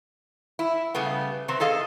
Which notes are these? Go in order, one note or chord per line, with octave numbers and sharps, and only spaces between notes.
E4
C#3 G3 A3 B3
C3 C4
G#4 A4 D#5 F5